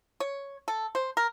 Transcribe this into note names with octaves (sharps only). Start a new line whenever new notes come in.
C#5
A4
C5
A#4